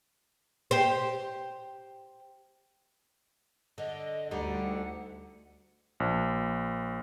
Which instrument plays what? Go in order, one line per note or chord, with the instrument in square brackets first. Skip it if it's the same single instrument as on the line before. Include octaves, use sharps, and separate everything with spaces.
[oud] G4 C5
[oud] D3 [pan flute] D#5
[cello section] D2 [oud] D3 G3 D#4 [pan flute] F#5
[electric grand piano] A#1